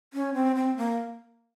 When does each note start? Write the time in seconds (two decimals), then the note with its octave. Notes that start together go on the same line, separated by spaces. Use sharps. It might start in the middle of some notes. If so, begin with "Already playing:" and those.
0.14 C#4
0.34 C4
0.56 C4
0.77 A#3